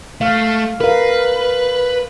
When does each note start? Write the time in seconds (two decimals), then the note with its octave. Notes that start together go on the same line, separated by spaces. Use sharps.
0.21 A3 F5
0.81 A#4 B4 F5